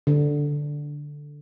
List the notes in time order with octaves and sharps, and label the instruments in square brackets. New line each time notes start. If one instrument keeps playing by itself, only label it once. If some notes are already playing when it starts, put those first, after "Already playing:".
[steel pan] D3